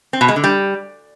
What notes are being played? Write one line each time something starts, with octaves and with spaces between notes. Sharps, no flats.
C4
B2
G#3
D3
G3